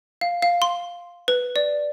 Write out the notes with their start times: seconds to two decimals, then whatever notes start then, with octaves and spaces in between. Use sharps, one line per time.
0.21 F5
0.42 F5
0.62 C6
1.28 B4
1.56 D5